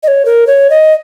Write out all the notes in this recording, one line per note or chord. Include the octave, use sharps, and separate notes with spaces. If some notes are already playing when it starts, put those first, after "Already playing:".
D#5
C#5
A#4
C#5
D#5